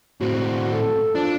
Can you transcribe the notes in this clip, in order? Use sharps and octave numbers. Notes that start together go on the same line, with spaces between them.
A2 C4 F#4
A4
F3 D4